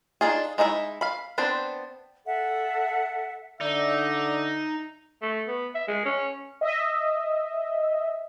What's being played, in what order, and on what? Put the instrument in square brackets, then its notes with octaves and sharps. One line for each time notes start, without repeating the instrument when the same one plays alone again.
[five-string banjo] D4 D#4 F4 G#4
G#3 D#4 E4 B4 E5
F5 B5
B3 C4 D4 C5
[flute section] A4 E5 F#5
[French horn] D3 [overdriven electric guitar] D#4 [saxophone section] D5 [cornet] E5
[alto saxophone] A3
B3
E5
G#3
C#4
[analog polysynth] D#5 E5